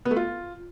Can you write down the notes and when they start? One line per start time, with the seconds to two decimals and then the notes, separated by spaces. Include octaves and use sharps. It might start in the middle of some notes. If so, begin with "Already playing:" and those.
0.05 B3
0.11 A3
0.16 F4